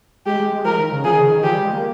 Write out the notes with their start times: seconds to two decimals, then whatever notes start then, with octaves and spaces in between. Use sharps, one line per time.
0.26 G#3 G4
0.40 G#3
0.52 G#3
0.65 F3 A#4
0.78 D#3
0.92 C#3
1.04 F3 G#4
1.13 D#3
1.21 C#3
1.29 D#3
1.43 F3 G4
1.53 G3
1.63 G#3
1.73 A#3